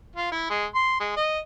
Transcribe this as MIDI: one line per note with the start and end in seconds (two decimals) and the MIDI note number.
0.16 0.30 65
0.32 0.48 64
0.50 0.66 56
0.75 0.98 84
1.00 1.13 56
1.17 1.39 75